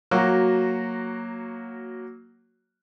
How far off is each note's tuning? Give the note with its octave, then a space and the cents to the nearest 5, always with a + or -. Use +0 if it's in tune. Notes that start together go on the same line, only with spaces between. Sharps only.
F#3 -5 A#3 +0 F#4 +0